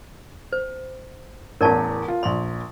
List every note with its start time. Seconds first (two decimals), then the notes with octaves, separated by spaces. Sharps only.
0.53 C5
1.61 A1 E2 A#4 D5 A5
2.08 F4
2.23 A#1 D5 B5 C6